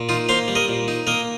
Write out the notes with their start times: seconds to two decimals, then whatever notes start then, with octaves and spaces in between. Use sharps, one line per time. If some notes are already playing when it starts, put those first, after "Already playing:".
Already playing: A#2
0.09 D#4 F4
0.29 A#3 C5 F5
0.48 G3
0.55 A#4 D#5
0.69 A#2
0.88 D#4
1.07 A#3 A#4 D#5